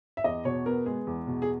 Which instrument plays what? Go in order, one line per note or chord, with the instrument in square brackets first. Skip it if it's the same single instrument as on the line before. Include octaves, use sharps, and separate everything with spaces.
[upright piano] E5
E2 D#5
B2 C#5
B3 A#4
G#3 G#4
E2
B2
G#4